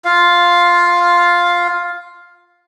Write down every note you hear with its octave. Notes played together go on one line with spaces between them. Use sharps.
F4 F5